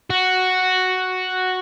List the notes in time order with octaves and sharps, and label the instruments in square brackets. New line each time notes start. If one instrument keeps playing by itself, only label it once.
[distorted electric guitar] F#4